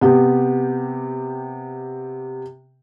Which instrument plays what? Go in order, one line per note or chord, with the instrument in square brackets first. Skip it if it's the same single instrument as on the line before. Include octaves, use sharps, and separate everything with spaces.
[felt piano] C3 B3 G4